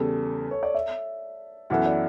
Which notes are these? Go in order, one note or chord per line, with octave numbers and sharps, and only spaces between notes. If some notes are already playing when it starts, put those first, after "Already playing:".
Already playing: E2 C#3 G3 A4
C#5
D5
E5
F#2 E3 B3 E4 A4 F#5
D5